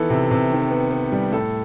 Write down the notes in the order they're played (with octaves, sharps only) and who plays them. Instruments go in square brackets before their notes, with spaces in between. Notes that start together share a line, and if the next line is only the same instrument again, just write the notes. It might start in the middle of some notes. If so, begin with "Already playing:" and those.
Already playing: [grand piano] D#3 E3 B3 A4
C3
C3
D#3
B3
B3
G3
A2 A4